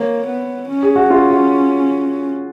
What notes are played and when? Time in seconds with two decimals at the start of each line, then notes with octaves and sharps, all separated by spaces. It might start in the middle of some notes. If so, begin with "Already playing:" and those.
Already playing: A#3 C#5
0.27 B3
0.69 C#4
0.83 G#4
0.96 F#4
1.10 C#4 F4
1.31 F#4